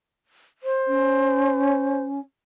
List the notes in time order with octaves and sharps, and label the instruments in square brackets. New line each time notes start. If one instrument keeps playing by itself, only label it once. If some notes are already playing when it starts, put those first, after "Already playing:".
[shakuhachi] C5
[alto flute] C#4